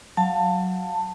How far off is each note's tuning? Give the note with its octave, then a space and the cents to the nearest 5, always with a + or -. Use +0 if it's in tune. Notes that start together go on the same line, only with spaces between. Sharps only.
F#3 +0 F5 +0 A5 +15